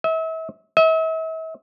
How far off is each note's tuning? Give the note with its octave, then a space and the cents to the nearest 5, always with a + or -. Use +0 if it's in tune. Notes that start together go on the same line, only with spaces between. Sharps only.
E5 -35
E5 -40